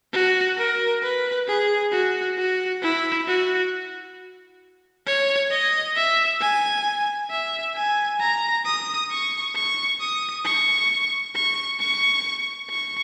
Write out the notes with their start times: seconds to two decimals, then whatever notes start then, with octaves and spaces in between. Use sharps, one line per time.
0.13 F#4
0.58 A#4
1.03 B4
1.48 G#4
1.92 F#4
2.37 F#4
2.83 E4
3.27 F#4
5.07 C#5
5.51 D#5
5.96 E5
6.41 G#5
7.31 E5
7.76 G#5
8.20 A#5
8.66 D#6
9.11 C#6
9.55 C#6
10.00 D#6
10.45 C#6
11.35 C#6
11.80 C#6
12.69 C#6